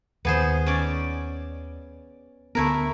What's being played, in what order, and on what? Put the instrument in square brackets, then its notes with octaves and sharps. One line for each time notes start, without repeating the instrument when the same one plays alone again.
[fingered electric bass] D#2 D#3 [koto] B3 G#4 C5
[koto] C#4 D5
[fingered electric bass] D2 B3 [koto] A3 E4 A#4